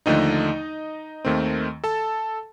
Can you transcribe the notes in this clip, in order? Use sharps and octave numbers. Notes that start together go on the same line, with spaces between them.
D#2 D3 F3 A3 D#4 D#5
D#2 D#3 A3 C4
A4 A5